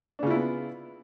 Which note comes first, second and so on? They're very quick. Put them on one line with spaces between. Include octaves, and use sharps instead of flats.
D4 C#3 F4 E4 B3